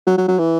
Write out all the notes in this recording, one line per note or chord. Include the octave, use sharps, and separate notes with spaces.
F#3
F#3
F#3
E3